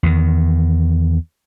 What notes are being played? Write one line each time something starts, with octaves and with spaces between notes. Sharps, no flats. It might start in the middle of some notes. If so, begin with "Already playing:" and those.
E2 D#3